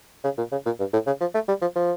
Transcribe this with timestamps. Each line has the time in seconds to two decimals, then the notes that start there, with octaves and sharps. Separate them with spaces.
0.24 C#3
0.38 A#2
0.52 C#3
0.66 A#2
0.80 G2
0.93 A2
1.07 C#3
1.21 F3
1.34 A3
1.48 G3
1.62 F3
1.76 F3